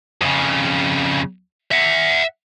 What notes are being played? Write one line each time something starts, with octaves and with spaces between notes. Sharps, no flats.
F2 C#3
E5 F#5